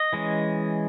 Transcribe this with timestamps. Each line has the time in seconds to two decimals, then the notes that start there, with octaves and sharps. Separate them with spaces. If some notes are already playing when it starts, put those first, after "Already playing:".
Already playing: D#5
0.13 E3 G#3 C#4